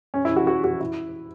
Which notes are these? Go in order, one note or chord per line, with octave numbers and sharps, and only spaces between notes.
C#4
E4
F#4
F#4
F#4
E4